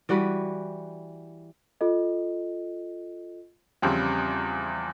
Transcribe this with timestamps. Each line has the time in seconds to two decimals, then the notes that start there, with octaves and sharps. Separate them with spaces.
0.09 E3 G3 F#4 B4
1.81 F4 A4 D#5
3.82 E2 C#3 F3 G3 C4